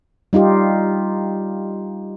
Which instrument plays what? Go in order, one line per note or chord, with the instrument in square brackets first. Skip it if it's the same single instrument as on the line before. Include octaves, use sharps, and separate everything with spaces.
[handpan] G3 D#4 F4 G4